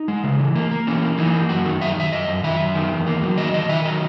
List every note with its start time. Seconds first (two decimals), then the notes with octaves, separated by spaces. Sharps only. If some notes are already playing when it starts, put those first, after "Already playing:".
Already playing: D#4
0.08 G#3
0.24 C#3
0.39 E3
0.56 A#3
0.71 A#3
0.87 E3 C#4
1.02 A#3
1.18 E3 D#4
1.34 A#3
1.49 F#2 F#4
1.66 D#3
1.81 F#2 E5
1.96 F#2 E5
2.12 F#2 D#5
2.28 F#2
2.43 D#3 E5
2.59 F#2
2.75 D#3
2.92 E2
3.06 A#3
3.22 F#3
3.38 D#3 D#5
3.54 E2 D#5
3.69 D#3 E5
3.85 F#3 D#5